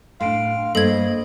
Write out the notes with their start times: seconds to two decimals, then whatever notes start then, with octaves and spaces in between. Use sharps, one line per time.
0.21 A2 D4 F5 C6 D7
0.75 G2 A3 A#3 A4 C5 D#5 G#6